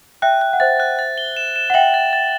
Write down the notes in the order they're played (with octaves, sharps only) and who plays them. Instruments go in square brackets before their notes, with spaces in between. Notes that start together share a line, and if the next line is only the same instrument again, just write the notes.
[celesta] E5 G5 [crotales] F#6
[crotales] F#6
[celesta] F#5
[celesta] C5 E5 [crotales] A6
[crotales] F#6
A6
G7
E7
E7
[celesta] F#5
[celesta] E5 G5 [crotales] F#7
[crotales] A6
A6